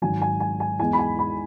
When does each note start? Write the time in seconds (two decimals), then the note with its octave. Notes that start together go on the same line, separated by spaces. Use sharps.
0.02 G#1 G#2 F#3 G#5
0.22 G#5
0.40 G#5
0.60 G#5
0.79 E2 E3 G#3 G#5
0.93 B5
0.99 G#5
1.19 B5